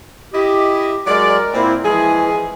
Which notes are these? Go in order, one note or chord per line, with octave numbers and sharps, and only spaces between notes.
E4 G4 D#5
F#3 G#3 A#4 D5
A#2 C4 E4
E3 F3 G#3 G#4